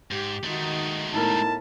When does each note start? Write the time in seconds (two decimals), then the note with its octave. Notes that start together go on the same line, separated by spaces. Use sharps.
0.11 G#2 G4
0.44 D#3 G#3 A3 D#4 F#4
1.14 A2 B3 D#4 E4 A#4 A5